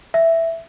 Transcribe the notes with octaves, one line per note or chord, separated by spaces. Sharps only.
E5